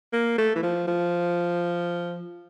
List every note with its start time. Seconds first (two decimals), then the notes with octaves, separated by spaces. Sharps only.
0.13 A#3
0.38 A3
0.56 E3
0.63 F3
0.88 F3